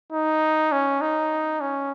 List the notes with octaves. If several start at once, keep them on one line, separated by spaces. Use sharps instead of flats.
D#4
C#4
D#4
C#4